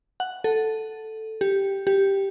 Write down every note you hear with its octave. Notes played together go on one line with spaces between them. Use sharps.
F#5
A4
G4
G4